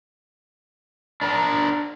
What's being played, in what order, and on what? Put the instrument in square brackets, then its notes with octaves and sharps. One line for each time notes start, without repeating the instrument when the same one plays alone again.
[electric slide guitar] D4 A#4